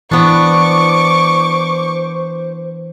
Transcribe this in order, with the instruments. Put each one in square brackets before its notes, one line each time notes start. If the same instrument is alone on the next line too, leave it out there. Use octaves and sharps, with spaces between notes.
[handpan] E3 [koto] B3 D4 [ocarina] C5 [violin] C#6 D6